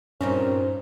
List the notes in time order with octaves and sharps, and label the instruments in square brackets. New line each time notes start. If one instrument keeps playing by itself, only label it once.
[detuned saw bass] G2 [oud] A#2 C4 D#4 [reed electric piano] C#4 [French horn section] C5